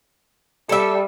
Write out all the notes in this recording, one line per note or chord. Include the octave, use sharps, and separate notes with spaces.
G3 A4 E5